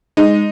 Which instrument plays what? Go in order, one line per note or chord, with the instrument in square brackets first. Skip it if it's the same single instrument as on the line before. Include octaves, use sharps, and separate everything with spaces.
[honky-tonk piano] G#3 D#4